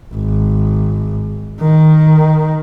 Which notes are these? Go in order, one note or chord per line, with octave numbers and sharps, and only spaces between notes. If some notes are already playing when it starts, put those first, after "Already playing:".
G#1
D#3